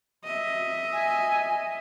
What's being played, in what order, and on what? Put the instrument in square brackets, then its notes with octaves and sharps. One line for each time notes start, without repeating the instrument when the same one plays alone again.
[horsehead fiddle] D#5 E5
[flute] G#5